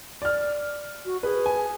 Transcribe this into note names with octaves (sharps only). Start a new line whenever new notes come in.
D5 F6
F#4
G#4 B4
G#5